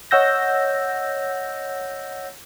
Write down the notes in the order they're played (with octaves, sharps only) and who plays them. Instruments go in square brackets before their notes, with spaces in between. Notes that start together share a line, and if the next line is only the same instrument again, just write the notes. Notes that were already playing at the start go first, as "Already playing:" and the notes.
[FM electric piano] C#5 D#5 F#5 E6 G6 A#6